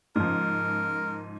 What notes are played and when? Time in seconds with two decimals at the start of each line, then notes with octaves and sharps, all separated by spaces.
0.16 G#2 C#3 F3 A#4